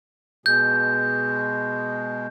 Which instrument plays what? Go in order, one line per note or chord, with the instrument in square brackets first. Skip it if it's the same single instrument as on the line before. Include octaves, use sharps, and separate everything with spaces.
[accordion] B2 G#3 [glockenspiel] G6